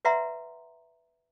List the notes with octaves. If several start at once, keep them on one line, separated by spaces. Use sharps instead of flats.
B4 D5 E5 F#5 A#5 C6